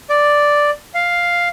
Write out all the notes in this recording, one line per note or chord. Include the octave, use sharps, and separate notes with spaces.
D5
F5